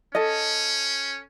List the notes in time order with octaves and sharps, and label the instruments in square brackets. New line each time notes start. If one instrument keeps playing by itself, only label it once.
[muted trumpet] C#4 [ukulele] A4 D#5